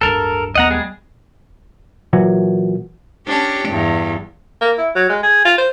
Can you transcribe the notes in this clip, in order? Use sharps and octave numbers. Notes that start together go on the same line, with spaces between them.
D1 G2 A4 A#4
A#1 D#2 B3 D#5 F#5 A#5
G3 G#3 G#4
A#2 E3 F#3
C#4 D4 G4
E2 G2
A#3
E4
F#3
G#3
G#4
F4
C5